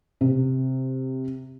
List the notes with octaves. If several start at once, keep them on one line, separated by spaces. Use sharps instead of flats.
C3